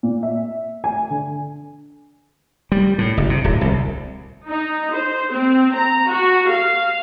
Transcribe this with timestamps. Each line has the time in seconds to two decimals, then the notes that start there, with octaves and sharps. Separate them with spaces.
0.03 A#2
0.23 E5
0.84 G#5
1.10 D3
2.72 G3
2.98 A2
3.17 F#1
3.30 C3
3.44 D1
3.61 C2
4.48 D#4
4.94 C5
5.33 C4
5.75 A#5
6.10 F#4
6.48 F5